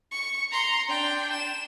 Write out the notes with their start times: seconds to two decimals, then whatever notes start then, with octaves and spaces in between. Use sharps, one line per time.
0.11 C#6
0.52 A#5 C6
0.89 D4 G5
1.33 E7